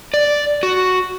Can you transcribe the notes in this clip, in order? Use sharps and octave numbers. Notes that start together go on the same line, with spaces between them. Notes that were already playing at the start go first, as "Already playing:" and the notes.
D5
F#4